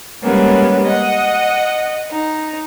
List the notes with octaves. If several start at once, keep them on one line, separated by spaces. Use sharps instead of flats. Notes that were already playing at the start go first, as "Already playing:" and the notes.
G3 G#3 A#3 B3 C#4
D#5 F#5
D#4